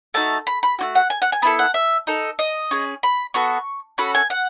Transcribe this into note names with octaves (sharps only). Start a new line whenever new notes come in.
A3 D#4 F#4 A5
B5
B5
A3 C#4 F#4
F#5
G#5
F#5
G#5
B3 E4 A4 B5
F#5
E5
D#4 A4
D#5
C#4 G#4
B5
B3 F#4 A4 C#6
C#4 F#4 A4 B5
G#5
F#5